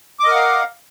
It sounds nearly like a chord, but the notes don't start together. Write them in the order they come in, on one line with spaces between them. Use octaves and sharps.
D6 D#5 A#4 F#5 F5